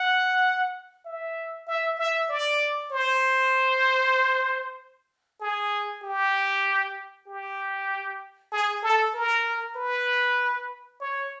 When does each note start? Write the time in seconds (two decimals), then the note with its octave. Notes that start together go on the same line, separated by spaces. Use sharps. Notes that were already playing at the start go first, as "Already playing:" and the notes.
Already playing: F#5
1.05 E5
1.67 E5
1.98 E5
2.29 D5
2.91 C5
5.41 G#4
6.03 G4
7.27 G4
8.51 G#4
8.83 A4
9.14 A#4
9.76 B4
11.00 C#5